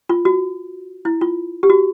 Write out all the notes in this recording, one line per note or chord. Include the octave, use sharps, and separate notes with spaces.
F4
F#4
E4
F4
G4
F#4